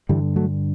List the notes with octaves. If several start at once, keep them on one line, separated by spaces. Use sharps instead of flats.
G2 D3 E3 G3
F#3 A3